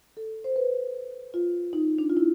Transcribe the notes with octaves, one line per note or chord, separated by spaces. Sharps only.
A4
C5
B4
F4
D#4
D4
F4
E4